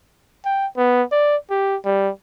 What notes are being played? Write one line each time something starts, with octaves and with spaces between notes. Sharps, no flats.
G5
B3
D5
G4
G3